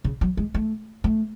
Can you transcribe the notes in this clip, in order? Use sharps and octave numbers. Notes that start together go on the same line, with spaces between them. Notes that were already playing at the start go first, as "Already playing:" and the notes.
C#3
F#3
G#3
A3
A3